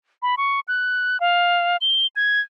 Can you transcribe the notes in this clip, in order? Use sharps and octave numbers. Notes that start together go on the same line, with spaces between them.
B5
C#6
F#6
F5
G7
G#6